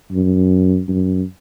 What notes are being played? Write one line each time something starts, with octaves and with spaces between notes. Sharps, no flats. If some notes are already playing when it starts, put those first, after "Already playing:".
F#2
F#2